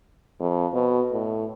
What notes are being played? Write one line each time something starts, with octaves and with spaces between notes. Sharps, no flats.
F2
B2
A2